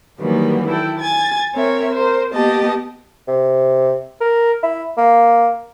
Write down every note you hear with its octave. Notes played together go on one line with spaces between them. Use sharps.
D#3 E3 F#3 G3 A#3 B3
E4 A4 G5
G#5 G#6 A6
C4 A#4 C#5 E5
A#4 C5
A#3 B3 G4 D#5 A5
C3
A#4
E4
A#3